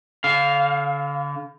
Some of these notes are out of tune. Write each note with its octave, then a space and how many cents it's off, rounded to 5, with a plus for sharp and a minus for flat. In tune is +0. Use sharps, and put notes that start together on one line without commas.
D3 -35 F5 +0